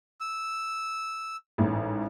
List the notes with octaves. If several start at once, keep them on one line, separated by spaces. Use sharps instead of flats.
E6
A1 G#2